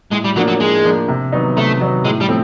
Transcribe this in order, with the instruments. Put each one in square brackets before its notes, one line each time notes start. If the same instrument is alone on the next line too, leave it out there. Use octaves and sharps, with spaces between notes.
[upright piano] A2 [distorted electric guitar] G#3
[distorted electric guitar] G3
[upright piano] F3 A#3 D4 [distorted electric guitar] F#3
[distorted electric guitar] F#3
[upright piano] A2 [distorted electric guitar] G#3
[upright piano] F3 A#3 D4
C3
D#3 F#3 B3 D#4
[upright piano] C3 [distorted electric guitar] A3
[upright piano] D#3 F#3 B3 D#4
[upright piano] A2 [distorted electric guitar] G#3
[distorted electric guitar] G3
[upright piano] F3 A3 C4